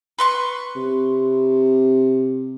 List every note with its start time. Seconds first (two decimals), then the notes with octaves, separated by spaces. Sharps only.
0.18 B4 C6 C#6
0.76 C3